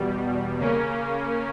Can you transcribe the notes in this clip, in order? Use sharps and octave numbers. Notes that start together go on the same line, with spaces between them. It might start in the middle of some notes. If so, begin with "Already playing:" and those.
Already playing: E2 B2 G3
C#3 A#3 C#4